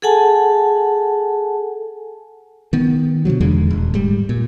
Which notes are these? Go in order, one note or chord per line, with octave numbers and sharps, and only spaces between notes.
G#4 A4 F#5 G#5 A5
D#3 B3
B2 D3 F3 F#3
E1 E2 D3 G#3
D#1
G#2 G3
A#2